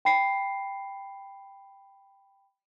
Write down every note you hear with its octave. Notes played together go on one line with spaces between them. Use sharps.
G5 B5 C7